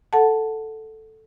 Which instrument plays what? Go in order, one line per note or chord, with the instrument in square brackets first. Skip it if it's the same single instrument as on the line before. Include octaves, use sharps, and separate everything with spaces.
[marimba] A4 F#5 A5